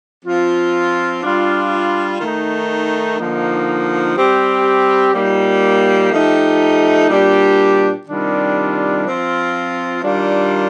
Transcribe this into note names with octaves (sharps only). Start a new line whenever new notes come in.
F3 C4 F4
G3 D4 F4
D#3 A3 D#4
D3 F3 A#3 D#4
G3 C4 G4
A#2 G3 A#3 D#4 G4
F3 A3 D#4 G4
A#2 G3 D4 G4
C3 D#3 G3 D4 F4
F3 C4 F4
D#3 G3 D4 F4